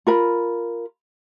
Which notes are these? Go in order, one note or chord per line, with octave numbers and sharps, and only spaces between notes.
F4 A#4 B5